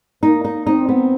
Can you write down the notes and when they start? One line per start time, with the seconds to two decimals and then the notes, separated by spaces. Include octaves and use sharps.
0.23 A#3 D#4
0.44 D#4
0.66 C4 D#4
0.89 B3